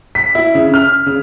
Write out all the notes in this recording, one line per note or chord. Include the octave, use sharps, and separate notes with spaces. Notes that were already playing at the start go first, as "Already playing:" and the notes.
B6
E4
C#3
F6
C#3